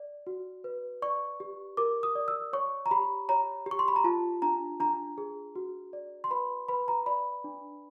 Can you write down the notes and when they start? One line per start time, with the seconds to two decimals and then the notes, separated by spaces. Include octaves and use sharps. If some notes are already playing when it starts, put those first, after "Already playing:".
Already playing: D5
0.27 F#4
0.64 B4
1.02 D5 C#6
1.40 G4
1.77 A#4 D6
2.03 D#6
2.15 D5
2.28 E6
2.53 C#5 C#6
2.86 A#5
2.91 G4 B5
3.29 C#5 A#5
3.66 G4
3.71 C#6
3.79 C6
3.88 B5
3.96 A#5
4.04 F4 A5
4.42 D4 A#5
4.80 D4 A#5
5.18 G#4
5.55 F#4
5.93 D5
6.24 C6
6.31 B4 B5
6.68 B4 B5
6.88 A#5
7.06 D5 B5
7.44 D4